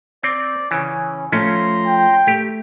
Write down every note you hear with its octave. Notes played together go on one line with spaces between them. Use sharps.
C4 D5
C#3 E3 C#4
F3 A3 C#4 A#5 C6
G5
A3 G4